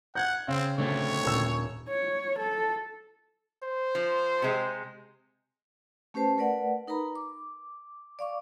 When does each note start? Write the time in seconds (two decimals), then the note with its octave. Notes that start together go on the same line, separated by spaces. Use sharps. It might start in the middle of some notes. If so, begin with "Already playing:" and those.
0.15 F#5 G6 G#6
0.48 C#3 C4
0.78 D3 A3 C4 C#5
1.25 D#1 E6
1.89 C#5
2.40 A4
3.63 C5
3.95 F3
4.42 C3 G#3
6.14 A3 C#4 G4 B4 C5 A5
6.37 A3 A#4 B4 D5 F#5
6.88 D#4 A#4 B4 A#5 B5
7.15 D6
8.19 D5 F5 C#6 D6